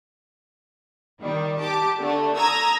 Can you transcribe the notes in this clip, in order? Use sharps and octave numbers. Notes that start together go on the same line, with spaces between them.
D#3 G3
G4 A5 D6
D3 A3
A#5 D#6 E6 G#6 A#6